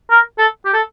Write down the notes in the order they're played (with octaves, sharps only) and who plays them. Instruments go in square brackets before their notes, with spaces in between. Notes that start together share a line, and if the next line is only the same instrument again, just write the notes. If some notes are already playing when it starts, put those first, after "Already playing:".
[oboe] A#4
A4
G4
A4